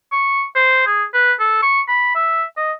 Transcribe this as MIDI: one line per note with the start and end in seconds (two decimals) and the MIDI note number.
0.12 0.43 85
0.55 0.82 72
0.86 1.04 68
1.14 1.33 71
1.40 1.60 69
1.62 1.81 85
1.88 2.11 83
2.15 2.44 76
2.57 2.72 75